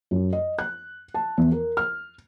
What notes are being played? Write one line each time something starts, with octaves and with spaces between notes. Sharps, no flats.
F#2
D#5
F#6
A5
E2
A#4
F6